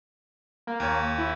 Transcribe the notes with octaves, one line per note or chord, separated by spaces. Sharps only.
A#3
D#2 C#5
E4